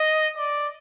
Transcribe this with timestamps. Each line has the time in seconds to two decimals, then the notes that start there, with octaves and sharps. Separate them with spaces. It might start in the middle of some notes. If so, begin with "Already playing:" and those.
Already playing: D#5
0.37 D5